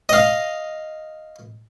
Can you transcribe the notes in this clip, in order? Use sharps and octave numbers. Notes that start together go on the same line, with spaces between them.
D#5 F5